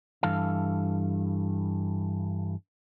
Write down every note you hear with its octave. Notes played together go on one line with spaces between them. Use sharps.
G2 E3 A4 F5